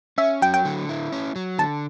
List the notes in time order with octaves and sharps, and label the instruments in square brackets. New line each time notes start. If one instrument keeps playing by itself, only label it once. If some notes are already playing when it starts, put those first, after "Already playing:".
[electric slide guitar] C#4 [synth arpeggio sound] E5
[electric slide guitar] F#3 [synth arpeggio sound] G5
[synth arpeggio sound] G5
[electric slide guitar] D3
E4
C#4
F#3
[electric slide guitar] D3 [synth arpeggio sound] A5